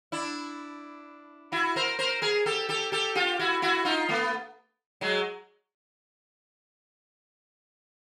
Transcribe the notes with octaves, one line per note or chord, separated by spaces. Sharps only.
D4 E4
E4 F#4
A#4 C5
A#4 C5
G#4 A#4
G4 A4
G4 A4
G4 A4
F4 G4
E4 F#4
E4 F#4
D#4 F4
A3 B3
F#3 G#3